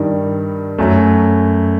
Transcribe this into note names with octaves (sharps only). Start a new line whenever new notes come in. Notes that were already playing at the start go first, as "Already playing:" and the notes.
Already playing: G2 D#3 G3
F#2 F#3 A3